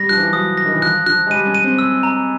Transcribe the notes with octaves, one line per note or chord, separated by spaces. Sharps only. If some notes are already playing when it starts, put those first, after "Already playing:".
Already playing: G3 A#6
F3 F#6
E3
F3
F#3 D#6
A#6
D#3
E3
F3 F#6
F3 F#6
G#3
G3 D#7
C#4
D#7
C4
E6
A#5